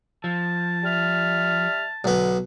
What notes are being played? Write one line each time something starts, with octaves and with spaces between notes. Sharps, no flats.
F3 A5
G3 E5 F6
B1 D3 B3